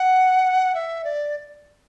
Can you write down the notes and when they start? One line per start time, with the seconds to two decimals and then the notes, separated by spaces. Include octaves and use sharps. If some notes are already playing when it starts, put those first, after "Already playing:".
Already playing: F#5
0.75 E5
1.04 D5